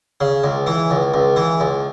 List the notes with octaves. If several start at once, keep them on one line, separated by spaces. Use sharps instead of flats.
C#3
C#2
E3
C#2
C#2
E3
C#2